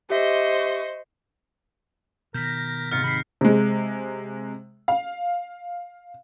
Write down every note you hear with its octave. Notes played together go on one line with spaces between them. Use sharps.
G4 C5 D#5 E5 C#6
B2 D#3 A#4 G6 A#6 B6
G#2 C3 F4 F6 A#6 C#7
D#3 B5 G6 C7
C3 G#3
F5